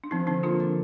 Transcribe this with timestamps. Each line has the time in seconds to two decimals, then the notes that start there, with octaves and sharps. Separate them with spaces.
0.04 D4
0.11 F3 C4 D#4
0.27 D3 C4 D#4
0.43 A#3 D4 F4
0.60 D4